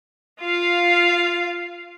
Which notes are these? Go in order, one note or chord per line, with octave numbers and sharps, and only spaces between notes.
F4 F5